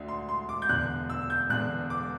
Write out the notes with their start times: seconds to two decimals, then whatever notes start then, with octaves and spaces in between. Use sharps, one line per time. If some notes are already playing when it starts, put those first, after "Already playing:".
Already playing: D2 D3
0.08 C6
0.29 C6
0.49 D6
0.62 G6
0.69 E1 E2 D3 F#6
1.10 E6
1.30 G6
1.50 E1 E2 D3 F#6
1.90 D6